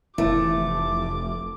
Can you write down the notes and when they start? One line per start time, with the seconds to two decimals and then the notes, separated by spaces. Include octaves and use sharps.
0.18 F1 E3 A3 D6